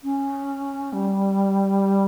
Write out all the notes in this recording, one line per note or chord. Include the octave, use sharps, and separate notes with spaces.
C#4
G3